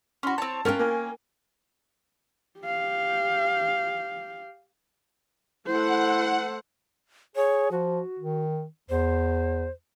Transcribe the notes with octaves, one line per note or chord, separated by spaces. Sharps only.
C#4 F#4 B5 C6
C4 C#5 A5
C#4 F4 A#4 G5 F#6
A#3 G#5
G4 F5
A3 E4 A4 C5 F#5
G#4 C#5
F3 F#4
D#3
E2 C5